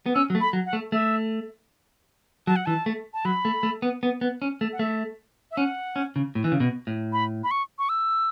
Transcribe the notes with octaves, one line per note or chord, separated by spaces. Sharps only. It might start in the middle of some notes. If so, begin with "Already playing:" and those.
B3
C#4 E6
F#3
A3
B5
F#3
F#5
A3
A3 E5
F#3 A5
F#5
E3 A5
A3
A5
F#3 B5
A3
A3
B3
B3
B3
C#4
A3
F#5
A3 E5
E5
C#4 F#5
C#4
C#3
A2
E3
C#3
B2
A2
B5
B5
C#6
C#6
E6